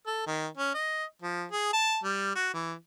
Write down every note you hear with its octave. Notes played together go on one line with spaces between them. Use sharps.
A4
D#3
C#4
D#5
F3
G#4
A5
G3
F#4
E3